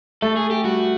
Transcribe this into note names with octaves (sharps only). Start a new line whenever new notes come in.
A3 A4
G#4
G4
G3 F#4